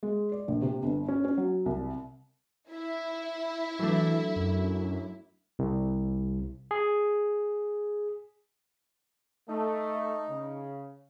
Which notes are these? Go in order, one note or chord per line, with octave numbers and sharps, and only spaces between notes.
G#3
D5
A#1
C3
G1
C#4
C#4
F#3
C2
E4
E3 F#3 A3 D4
F#2
C2
G#4
A3 D#4
C#3